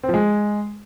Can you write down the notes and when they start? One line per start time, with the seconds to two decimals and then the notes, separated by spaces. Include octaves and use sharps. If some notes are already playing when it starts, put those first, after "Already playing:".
0.03 C4
0.09 F3
0.14 G#3